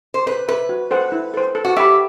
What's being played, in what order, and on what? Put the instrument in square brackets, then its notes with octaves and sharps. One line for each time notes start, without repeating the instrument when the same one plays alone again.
[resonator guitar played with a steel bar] C5
[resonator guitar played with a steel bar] B4 [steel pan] C5
[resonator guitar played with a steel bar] B4 [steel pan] E5 B5
[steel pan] F#4
A4 C5 F#5
E4
A4 C5
A4
[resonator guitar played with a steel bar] F#4
[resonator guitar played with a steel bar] G4 [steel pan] E5 B5